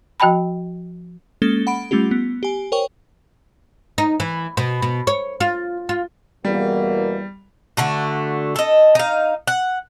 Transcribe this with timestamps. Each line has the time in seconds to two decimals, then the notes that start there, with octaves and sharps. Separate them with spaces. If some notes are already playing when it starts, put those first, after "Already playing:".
0.20 F3 F#4 D#5 G5 A5 B5
1.42 G#3 A#3 C#4 A4 A6 G7
1.67 F#5 B5 D7
1.91 G3 A3 C#4 F4 G4
2.11 B3
2.43 G4 G#5
2.72 A#4 C5 C#5 G5 C#6
3.98 D#4
4.20 E3
4.57 B2
4.82 B2
5.07 C#5
5.40 F4
5.89 F4
6.45 E2 B2 G3 A#3
7.77 D3 A3 F#4
8.56 A4 D#5
8.95 D#4 F5
9.47 F#5